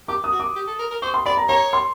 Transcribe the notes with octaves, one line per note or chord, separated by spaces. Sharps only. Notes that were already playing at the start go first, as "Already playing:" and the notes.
G4 D6
D#6
F#4
D6
G4
A4
A#4
A#4
C5 C#6
C6
D5 B5
A#5
C#5 A#5
C6